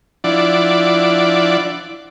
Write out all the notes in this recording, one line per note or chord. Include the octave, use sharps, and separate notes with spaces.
F3 D4 E4 D5 F#5